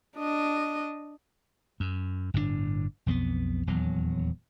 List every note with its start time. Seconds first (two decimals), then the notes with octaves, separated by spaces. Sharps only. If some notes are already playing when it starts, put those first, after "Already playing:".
0.17 D4 D#5
1.80 F#2
2.34 G1 A2 C3 D4
3.06 B1 F2 G3 B3
3.67 D#1 E2 F#3